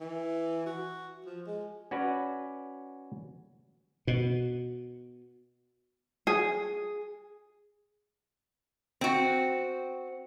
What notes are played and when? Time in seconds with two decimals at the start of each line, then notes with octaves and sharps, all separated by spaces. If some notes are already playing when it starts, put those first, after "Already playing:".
0.01 E3
0.66 F#4
1.26 F3
1.46 G#3
1.91 C#4 F#4 B4 D5
4.07 B2
6.27 G#4
9.01 C4 F#4